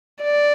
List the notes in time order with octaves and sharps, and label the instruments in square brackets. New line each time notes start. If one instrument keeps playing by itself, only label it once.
[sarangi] D5